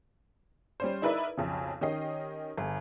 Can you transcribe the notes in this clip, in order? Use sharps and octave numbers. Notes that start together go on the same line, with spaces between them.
G3 C#4 C5
D#4 E4 A#4 B4 D5 E5
B1 F2 C#3
D#3 C#4 G4 D#5 C7
G1